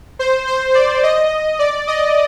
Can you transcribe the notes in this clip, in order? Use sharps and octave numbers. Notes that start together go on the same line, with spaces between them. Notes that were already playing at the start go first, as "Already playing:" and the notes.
C5
C5
D5
D#5
D5
D#5